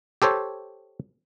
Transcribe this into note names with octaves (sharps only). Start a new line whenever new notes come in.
G4 A4 C5 C#5